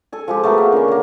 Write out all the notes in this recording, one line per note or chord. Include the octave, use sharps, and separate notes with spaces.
A4 G#5
F3 G#3 G4
A3 B3 F#4 A#4
A#3
D3 C#4
C#3 A#3